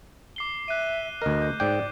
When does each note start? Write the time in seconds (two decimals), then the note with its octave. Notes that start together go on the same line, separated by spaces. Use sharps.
0.36 D6 C7 G7
0.68 E5 F#6 D#7
1.22 D2 A#4 D#5
1.42 G6
1.60 G#2 D5 G5 D6